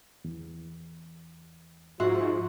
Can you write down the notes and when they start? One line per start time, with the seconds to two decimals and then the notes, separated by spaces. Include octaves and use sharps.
0.24 E2
2.00 G#2 F3 F#4 E5 C6